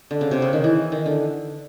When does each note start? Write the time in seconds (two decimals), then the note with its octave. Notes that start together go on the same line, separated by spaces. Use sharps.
0.11 D3
0.21 C#3
0.31 C3
0.42 C#3
0.53 D#3
0.64 E3
0.92 D#3
1.06 D3